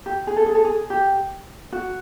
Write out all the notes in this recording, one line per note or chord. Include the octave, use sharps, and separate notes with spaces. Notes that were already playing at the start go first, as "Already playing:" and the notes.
G4
G#4
A4
G#4
A4
G#4
G4
F#4